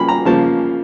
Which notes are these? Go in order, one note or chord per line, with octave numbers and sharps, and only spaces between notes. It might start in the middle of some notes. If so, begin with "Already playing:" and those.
Already playing: C#3 F3 A#3 B5
A#5
C#3 F3 A#3 A5